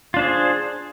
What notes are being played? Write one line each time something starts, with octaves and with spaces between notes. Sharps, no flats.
D4 F4 G#4 C5